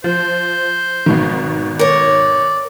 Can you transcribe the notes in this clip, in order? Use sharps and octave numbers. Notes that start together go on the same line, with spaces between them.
F3 C5
G#1 B2 D#3
A#4 C#5 D5